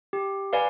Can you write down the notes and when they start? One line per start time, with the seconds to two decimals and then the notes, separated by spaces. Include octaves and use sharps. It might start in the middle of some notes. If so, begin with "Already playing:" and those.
0.13 G4
0.53 B4 D5 F5 G#5